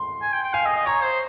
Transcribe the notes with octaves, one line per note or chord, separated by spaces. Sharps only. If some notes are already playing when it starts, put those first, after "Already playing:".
Already playing: C6
G#5
G5
G5
F5 G#5
D#5
D#5
C#5 A#5
C5